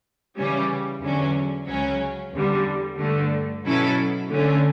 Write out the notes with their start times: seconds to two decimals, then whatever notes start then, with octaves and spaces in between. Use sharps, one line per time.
0.36 C#3 E3 G3 C#4
1.01 E2 D3 F#3 C#4
1.67 C#2 C#3 F#3 C#4
2.32 E2 D3 G3
2.98 G2 D3 A3
3.64 B2 F#3 C#4 E4 A4
4.30 D3 A3 C#4